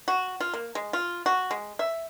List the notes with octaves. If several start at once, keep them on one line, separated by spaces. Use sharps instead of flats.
F#4
F4
A#3
G#3
F4
F#4
G#3
E5